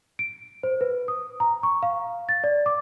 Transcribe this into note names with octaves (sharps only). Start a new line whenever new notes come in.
D7
C5
B4
D#6
A#5
C#6
F5
A6
D5
D6